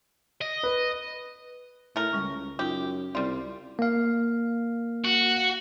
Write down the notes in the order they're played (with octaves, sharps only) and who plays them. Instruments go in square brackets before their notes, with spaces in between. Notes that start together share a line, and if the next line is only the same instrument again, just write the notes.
[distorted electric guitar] D#5
[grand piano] B4
[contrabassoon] A2 [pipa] A3 A#4
[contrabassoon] C#2 [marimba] C#3 G3 C#6
[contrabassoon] F#2 [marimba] D#4 F4 [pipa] G4
[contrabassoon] C2 [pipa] G3 F4 [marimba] D5
[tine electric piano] A#3 F5
[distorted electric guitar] F#4